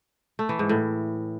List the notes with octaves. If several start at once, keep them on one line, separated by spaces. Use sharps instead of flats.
A3
E3
G#2
A2